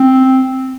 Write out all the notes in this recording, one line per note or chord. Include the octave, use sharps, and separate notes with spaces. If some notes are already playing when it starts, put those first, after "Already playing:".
Already playing: C4